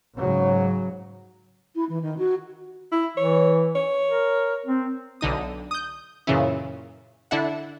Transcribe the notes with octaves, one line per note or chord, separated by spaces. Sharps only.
G#2 C#3 F#3
E4
E3
D#3
F#4
E4
E3 C#5
C#5
A#4
C4
B1 D3 D#4 D#6
D#6 G6
F#2 A#2 C#3 E3 C#4 E4
D3 D4 E4 E5 F#5